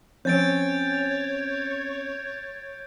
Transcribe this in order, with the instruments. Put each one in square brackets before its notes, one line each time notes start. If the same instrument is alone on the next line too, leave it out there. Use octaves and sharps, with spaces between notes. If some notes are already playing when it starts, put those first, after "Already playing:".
[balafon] F3 [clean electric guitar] C4 C#4 [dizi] C#5 [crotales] G6 A6 D7